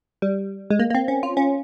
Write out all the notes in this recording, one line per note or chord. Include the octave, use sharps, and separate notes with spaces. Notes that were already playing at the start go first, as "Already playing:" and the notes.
G3
G#3
A#3
A#3
C4
C#4
F4
C#4